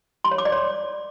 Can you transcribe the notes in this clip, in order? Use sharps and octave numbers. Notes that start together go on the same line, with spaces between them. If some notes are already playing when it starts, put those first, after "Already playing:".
C6
C#5
D6
D5
C#5